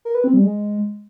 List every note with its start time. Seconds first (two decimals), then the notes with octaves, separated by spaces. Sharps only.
0.05 A#4
0.15 B4
0.24 C4
0.33 G3
0.43 G#3